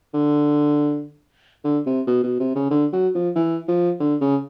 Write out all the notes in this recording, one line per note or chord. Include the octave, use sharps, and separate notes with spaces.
D3
D3
C3
B2
B2
C3
C#3
D3
F#3
F3
E3
F3
D3
C#3